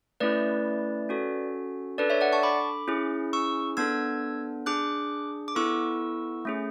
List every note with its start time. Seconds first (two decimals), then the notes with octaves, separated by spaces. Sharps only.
0.20 A3 C#4 E4 B4 D5
1.09 C#4 F#4 A4
1.98 D4 A4 B4 D5
2.10 C#5 E5
2.21 D5 F#5
2.32 A5 C#6
2.43 B5 D6
2.88 C#4 E4 G#4
3.33 C#6 E6
3.77 B3 D4 A4 E6 G#6
4.66 D4 G#4 D6 F#6
5.48 D6
5.55 B3 E4 A4 C#6 E6
6.45 A3 C#4 G#4